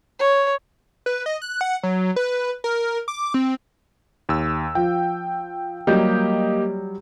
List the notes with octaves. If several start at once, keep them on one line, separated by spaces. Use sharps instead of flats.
C#5
B4
D#5
F#6
F#5
F#3
B4
A#4
D6
C4
D#2 E6
F3 G5
F#3 G3 A#3 G4 D#5 G6